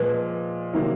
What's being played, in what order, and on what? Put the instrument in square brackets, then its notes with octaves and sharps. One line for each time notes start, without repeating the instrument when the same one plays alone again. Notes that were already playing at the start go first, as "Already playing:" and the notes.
Already playing: [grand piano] A#2 F3 G#3 [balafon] B4
[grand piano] C3 D#3 F#3 A#3